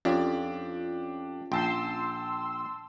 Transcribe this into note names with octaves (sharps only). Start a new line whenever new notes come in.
F2 C#4 D4 F4 G4
A#1 G5 A5 C6 E6 G6